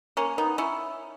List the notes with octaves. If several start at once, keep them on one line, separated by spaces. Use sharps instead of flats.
A#3 C#4
B3 D#4
C#4 E4